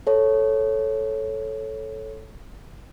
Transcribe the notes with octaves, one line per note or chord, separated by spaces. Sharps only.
A4 C#5